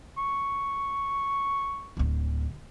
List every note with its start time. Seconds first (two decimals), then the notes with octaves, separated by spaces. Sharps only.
0.18 C#6
1.97 D1 D2